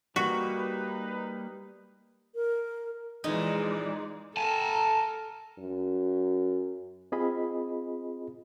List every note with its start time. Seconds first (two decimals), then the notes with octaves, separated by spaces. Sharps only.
0.16 G3 A#3 D#4 F#4 B4
2.35 A#4
3.24 F2 A#2 E3 G#3 D#4 D5
4.37 A4 A#4 G#5 A5
5.59 F#2
7.12 C4 F4 G#4 D#5 B5